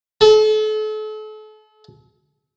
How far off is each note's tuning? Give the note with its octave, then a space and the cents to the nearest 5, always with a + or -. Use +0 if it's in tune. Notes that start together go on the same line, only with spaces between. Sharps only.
A4 -40